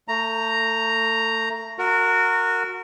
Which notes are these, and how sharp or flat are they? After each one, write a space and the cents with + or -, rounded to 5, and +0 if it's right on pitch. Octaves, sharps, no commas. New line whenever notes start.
A3 +30 A#5 +0
F#4 -15 A#4 -25